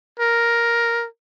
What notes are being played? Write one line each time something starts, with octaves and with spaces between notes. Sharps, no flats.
A#4